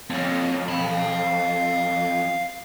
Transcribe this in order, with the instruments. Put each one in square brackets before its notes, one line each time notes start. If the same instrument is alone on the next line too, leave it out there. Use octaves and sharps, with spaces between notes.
[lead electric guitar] F2 [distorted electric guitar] C4 C#5
[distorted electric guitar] F5 B5